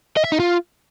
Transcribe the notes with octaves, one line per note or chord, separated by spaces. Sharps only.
D#5
E5
D#4
F4